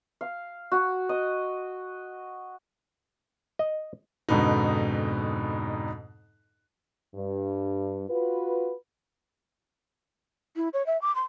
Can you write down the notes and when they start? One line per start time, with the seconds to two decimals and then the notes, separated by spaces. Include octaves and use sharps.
0.21 F5
0.72 F#4
1.09 D#5
3.59 D#5
4.28 F2 G#2 B2 D3 B3 D#4
7.15 G2
8.09 F4 F#4 B4
10.56 E4
10.73 C#5
10.86 E5
11.02 D6
11.15 C6